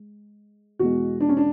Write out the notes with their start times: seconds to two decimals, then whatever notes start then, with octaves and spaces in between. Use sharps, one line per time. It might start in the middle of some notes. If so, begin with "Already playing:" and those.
Already playing: G#3
0.79 E2 B2 G#3 F#4
1.21 D4
1.29 C#4
1.37 D4